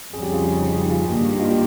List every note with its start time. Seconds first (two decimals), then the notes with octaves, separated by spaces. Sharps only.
0.12 F2 C#3 G3 G#4
0.22 G4
0.32 F4 G#4
0.59 D#4 G4
0.74 D#4 G4
0.89 F4 G#4
1.05 G2 D#3 G3 A#3 D#4 G4
1.29 G4
1.39 F4
1.50 D#4 G4